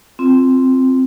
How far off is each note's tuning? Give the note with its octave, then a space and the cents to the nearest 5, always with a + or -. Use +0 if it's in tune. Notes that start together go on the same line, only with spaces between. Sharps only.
C4 +0 F4 +0